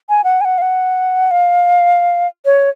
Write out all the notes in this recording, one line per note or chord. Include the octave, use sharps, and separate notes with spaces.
G#5
F#5
G#5
F#5
F5
F#5
F5
C#5